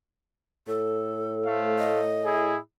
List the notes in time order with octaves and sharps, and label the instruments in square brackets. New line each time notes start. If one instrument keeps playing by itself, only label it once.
[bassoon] A2 [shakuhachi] A4
[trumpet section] A3 C5 F5
[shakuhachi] D#5
[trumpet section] E4 G#4